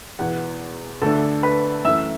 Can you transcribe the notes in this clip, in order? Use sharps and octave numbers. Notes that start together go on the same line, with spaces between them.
E2 B2 B3 E4 F#5
D2 D3 A3 D4 A4 A5
B4 B5
F#2 E3 A3 E5 E6